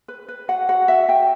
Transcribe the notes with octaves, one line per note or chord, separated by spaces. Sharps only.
B4
B4
F#4 F#5
F#4 F#5
F#4 E5
F#4 G5